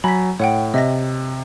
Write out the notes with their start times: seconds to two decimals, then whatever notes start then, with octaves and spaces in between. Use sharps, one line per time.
0.04 F#3 G#5 A#5 B5 B6
0.39 A2 C#5 F#5 G5
0.74 C3 D#5 E5 A#6